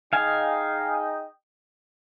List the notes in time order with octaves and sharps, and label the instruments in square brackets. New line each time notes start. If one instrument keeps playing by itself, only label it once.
[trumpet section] D#4 G#4 D#5 G5 [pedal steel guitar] F5 G#5